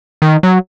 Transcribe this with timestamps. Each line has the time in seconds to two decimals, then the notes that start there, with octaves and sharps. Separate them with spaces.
0.22 D#3
0.43 F#3